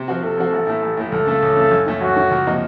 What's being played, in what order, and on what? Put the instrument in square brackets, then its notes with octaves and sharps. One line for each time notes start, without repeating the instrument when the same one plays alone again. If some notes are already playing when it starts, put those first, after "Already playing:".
Already playing: [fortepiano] C3
F3 C4 F#4
[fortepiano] C3 [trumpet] A4
[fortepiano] F3 C4 F#4
A1
A2 A3
A1
A2 A3
[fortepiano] C#2 [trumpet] A4
[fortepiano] C#3 A3
C#2
C#3 A3
F#2
D#3 A3 C#4
[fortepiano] F#2 [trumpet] F#4
[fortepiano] D#3 A3 C#4
C#2
C3 F3 A#3 D#4